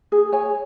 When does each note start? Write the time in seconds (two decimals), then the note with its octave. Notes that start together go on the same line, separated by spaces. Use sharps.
0.12 G#4
0.32 C#5 G#5